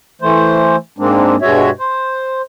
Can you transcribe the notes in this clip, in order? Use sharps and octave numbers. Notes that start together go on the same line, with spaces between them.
E3 A3 C5
G#2 G#3 A#3 C4 D4
G2 B2 G#3 F#4 C#5 E5
C5